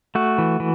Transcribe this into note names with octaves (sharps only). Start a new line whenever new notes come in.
A3 F#4
E3
E3